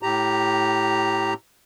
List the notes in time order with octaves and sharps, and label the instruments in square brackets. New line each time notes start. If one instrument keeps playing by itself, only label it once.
[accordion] A2 G4 A#5